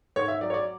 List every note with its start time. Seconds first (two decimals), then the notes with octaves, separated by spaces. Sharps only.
0.16 G#2 C#5
0.28 E5
0.41 F#3 D5
0.50 C#5
0.54 D5